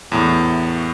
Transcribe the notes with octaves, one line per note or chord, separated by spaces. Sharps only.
E2 A2